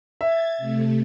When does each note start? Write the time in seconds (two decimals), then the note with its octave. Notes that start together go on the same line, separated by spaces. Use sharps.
0.21 E5 G#6 A6
0.58 C3 A3